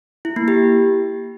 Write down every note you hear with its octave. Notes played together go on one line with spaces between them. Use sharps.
E4
A#3
G4